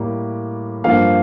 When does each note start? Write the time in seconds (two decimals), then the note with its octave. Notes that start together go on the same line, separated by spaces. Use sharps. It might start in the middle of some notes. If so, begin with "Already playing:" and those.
Already playing: A2 G3 A#3
0.84 G2 F3 A#3 F5